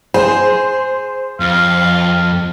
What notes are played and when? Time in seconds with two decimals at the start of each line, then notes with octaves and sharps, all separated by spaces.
0.14 G#4 C5
1.40 F2 F5